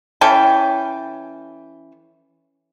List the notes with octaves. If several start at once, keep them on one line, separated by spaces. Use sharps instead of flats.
E3 C#4 A4 G5